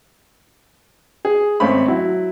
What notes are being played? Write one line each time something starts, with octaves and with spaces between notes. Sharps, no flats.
G#4
G#1 A3 C4 C#4 B5
F#3 E4